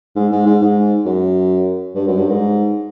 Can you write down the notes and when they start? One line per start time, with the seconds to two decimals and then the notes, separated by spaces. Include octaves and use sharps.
0.16 G#2
0.31 G#2
0.46 G#2
0.62 G#2
1.06 F#2
1.95 G2
2.07 F#2
2.19 G2
2.29 G#2